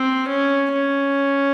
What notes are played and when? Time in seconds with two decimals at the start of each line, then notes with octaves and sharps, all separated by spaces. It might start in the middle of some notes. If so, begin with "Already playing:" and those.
Already playing: C4
0.28 C#4
0.73 C#4